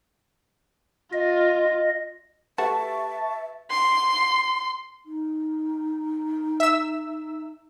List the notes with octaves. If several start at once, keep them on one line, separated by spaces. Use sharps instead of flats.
F4 D#5
A3 F#4 G4 B4 E5 A5 C#6 A6
C6
D#4
E5 E6